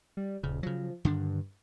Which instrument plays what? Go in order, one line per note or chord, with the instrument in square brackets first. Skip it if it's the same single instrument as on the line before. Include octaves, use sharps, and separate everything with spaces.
[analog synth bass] G3
[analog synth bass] D#1 [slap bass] C#3
[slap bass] C#3 F#3 [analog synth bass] F3
[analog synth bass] G2 [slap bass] D3 D#3 D4